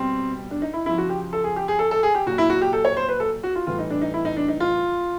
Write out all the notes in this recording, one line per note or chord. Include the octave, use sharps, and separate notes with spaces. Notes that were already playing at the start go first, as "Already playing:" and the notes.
Already playing: B2 G3 C4
D4
D#4
E4
C#3 F3 E4
F#4
G4
A4
G#4
G4
G#4
A4
A4
G#4
G4
A#2 F#3 F#4
E4
F#4
G4
A4
C#5
C5
B4
A4
F#4
F4
A2 E3 G3 F4
D#4
D4
D#4
E4
D#4
D4
D#4
F4